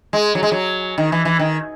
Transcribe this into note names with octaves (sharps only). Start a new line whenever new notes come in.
G#3
F#3
G#3
F#3
D#3
E3
E3
D#3